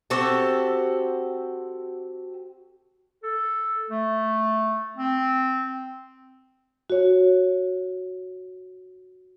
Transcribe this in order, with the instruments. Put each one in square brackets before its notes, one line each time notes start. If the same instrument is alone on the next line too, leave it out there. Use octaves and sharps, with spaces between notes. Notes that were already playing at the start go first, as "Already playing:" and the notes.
[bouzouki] C4 F#4 G4 A4
[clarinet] A4
A3
C4
[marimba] F#4 C#5